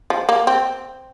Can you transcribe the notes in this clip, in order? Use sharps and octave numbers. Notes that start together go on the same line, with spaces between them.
F3
A#3
C4